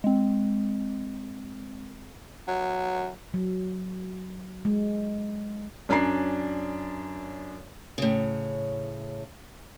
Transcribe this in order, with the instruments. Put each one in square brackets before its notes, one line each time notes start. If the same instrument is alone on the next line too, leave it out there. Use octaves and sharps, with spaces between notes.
[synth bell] G#3 C4
[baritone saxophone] F#3
[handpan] F#3
G#3
[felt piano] F#2 C#4 D4 D5 A#5 C7
[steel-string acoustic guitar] A2 C#3